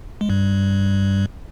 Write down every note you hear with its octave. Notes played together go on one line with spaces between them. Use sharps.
G#3
G2 G3